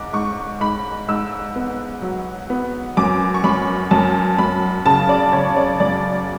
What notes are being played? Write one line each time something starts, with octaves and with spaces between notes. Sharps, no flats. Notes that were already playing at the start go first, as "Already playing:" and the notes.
Already playing: G#2 D6
G#2 C#6
G#2 B5
G#2 E6
B3
F#3
B3
F#2 D6
C#6
F#2 B5
F#2 A5
F#2 B5
C#3 A5
D5
C#3 C#5
D5
F#2 D5